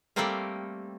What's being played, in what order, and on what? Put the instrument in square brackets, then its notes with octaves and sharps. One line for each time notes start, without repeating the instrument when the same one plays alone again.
[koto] G3 A3 A#3 C4 A#4 F5